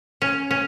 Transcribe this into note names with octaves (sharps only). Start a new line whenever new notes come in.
C#4
C#4